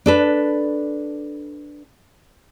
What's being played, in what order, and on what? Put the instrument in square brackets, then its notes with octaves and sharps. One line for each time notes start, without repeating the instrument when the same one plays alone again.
[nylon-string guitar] D4 A4 B4